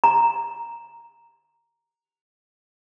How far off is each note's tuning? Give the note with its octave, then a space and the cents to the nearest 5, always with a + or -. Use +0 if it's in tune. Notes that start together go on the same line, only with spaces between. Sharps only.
A#5 +0